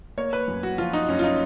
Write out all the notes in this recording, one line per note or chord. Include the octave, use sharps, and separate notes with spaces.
A#3 C#5
B4
F#2
F#4
F3 F4
D#4
F#2 C#4
F4
D#4